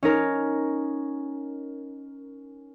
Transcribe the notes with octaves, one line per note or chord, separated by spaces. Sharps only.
C#4 D#4 A#4